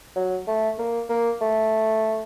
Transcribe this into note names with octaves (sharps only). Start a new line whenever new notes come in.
F#3
A3
A#3
A#3
A3